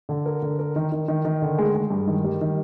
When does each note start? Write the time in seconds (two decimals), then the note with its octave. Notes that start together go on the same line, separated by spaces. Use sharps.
0.09 D3
0.26 A#4
0.42 D3
0.59 A#4
0.76 D#3
0.92 D#3
1.08 D#3
1.25 D#3
1.42 D3
1.58 G#3
1.75 G#3
1.90 G2
2.07 D#3
2.24 G3
2.41 D#3